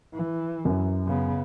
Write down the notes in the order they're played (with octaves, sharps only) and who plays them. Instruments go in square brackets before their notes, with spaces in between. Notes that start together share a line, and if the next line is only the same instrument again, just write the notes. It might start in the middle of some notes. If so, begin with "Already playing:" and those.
[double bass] E3
[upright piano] F#2
[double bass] C#3 B3